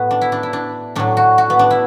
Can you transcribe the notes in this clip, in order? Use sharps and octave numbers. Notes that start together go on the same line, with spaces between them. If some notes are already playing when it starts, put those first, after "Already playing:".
Already playing: A2 F#3 B3
D4
E4
D4
E4
D4
A2 F#3 D4
F#4
F#4
B3
D4
E4